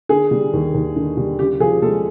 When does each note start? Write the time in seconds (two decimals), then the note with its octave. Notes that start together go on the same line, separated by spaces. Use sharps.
0.09 D3 G#4
0.31 G3
0.53 D#2
0.74 D#2
0.96 D3
1.17 G3
1.39 C#3 G4
1.60 F3 G#4
1.82 G#3 A4